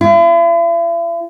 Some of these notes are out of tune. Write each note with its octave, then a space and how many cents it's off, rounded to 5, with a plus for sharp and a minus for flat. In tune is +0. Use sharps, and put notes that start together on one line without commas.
E4 +45